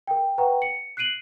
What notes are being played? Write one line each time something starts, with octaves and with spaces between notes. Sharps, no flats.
A#4 G5
B4 F#5 G5 A#5 C#6
C#7
F#6 C7 D7 D#7 F#7